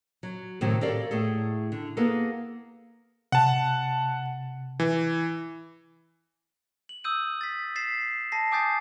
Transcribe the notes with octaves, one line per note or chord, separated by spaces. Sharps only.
F#3
A2 C3 D#3 F#3 C4
G4 A4 A#4 C#5 D5 F5
A2 A3 G#4 A4
D3
A#3 B3 G#4 A4
C3 F#5 A5
E3
F#7
D#6 E6 G6 D#7
A6 B6
A6 B6 C7 E7
A5 A#6 C7
G#5 D6 D#6 G6 A6 C7